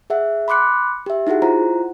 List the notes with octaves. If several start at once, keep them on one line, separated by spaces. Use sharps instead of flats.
G#4 E5 F#5
B5 C6 D6 F#6 C#7
G4 E5
D#4 E4 F#4 G#4 F#5
E4 F4 C5 F#5 A#5